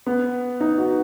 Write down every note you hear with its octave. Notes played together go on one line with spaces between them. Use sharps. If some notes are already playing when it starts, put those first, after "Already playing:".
B3
D#4
F#4